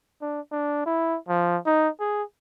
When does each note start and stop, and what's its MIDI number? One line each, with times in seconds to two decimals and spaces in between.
0.21 0.40 62
0.52 0.85 62
0.86 1.17 64
1.28 1.57 53
1.66 1.89 63
2.00 2.23 68